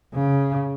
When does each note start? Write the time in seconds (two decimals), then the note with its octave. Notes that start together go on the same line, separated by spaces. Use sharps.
0.14 C#3